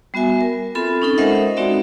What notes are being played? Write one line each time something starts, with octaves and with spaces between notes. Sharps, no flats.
G3 B3 F#4 E5 G#5
A#4
C4 F4 A4 B5
C#4 D#4 A4
G#3 A#4 C5 D#5 E5 F#5
G#3 C4 D#4 F#4 D5 E5